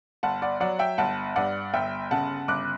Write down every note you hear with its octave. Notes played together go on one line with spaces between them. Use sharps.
G1 F#5 A5
D5 F#5
F#3 D5 F#5
E5 G5
G1 F#5 A5
G2 D5 F#5
G1 E5 G5
C#3 F#5 A5
G1 D6 F#6